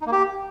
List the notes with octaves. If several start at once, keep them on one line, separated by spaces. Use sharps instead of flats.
D#4
A#3
G4